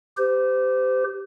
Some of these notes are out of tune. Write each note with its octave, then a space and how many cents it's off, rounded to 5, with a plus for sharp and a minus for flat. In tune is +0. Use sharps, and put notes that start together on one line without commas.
G4 +0 C5 -35